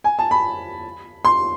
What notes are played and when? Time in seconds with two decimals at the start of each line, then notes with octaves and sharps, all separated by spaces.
0.04 G#5
0.19 A5
0.31 B5
1.25 C6